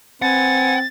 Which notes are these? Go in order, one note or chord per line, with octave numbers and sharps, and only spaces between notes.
C4 B4 F#5 G#5 A6